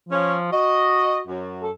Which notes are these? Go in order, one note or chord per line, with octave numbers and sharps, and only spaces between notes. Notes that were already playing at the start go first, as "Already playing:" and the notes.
F3 C#4
F#4 D#5
F#2
A4